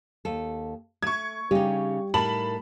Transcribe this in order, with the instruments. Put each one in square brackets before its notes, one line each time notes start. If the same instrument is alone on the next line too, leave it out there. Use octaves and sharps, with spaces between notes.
[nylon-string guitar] D#2 A4
[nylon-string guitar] A3 [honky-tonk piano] C#6 G#6
[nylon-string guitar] C#3 D#4 [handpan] G3 G4
[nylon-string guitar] A2 D#4 A#4 [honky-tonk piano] A5 B5 F#7